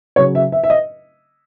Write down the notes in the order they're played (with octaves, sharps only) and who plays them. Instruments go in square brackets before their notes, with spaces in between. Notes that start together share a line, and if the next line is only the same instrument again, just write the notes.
[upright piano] C#3 F#3 C#5
E5
E5
E5
D#5